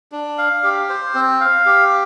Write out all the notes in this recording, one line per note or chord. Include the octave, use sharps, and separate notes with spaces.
D4
F5
G4
C5
C4
F5
G4